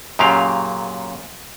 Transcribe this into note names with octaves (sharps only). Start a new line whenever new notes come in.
F#2 A#2 C#3 F#3 G4 F5